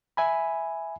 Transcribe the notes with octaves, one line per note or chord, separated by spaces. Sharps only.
E5 G#5 B5